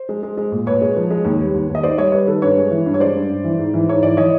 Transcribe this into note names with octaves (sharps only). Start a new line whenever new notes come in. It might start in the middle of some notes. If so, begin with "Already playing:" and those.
Already playing: C5
G#3
G#3
G#3
A#2
A#2 B4 C#5
G#3
F3
G#3
D#2
G3
D#2
D#2
D#5
D#3 C5 D5
G3 C#5 D#5
G3 B4 C#5
D#3 A4 B4
G2 B4 C#5
G#3
E3
G2
C#5
G#3 C5 D5
G2
G2
E3
G#2
E3
G#2 C#5
E3 D5
E3 C#5 D#5